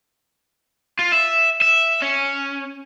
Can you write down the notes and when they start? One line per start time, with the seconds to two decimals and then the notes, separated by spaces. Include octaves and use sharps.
0.99 F4
1.12 E5
1.62 E5
2.02 C#4